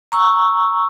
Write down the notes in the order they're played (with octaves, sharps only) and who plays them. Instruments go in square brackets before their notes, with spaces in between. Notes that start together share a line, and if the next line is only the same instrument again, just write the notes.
[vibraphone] A#5 C#6 E6